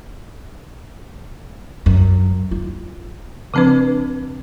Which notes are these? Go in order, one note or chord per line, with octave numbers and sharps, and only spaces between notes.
F#2
F4
C#3 F3 C4 D4 B4